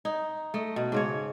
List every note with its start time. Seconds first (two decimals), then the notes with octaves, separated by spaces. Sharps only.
0.05 D#4
0.54 A3 D#5
0.76 B2
0.92 G#2 C#3 C#5